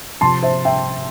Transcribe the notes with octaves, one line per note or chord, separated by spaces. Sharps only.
C3 F3 A5 C6
C5 E5
E5 G5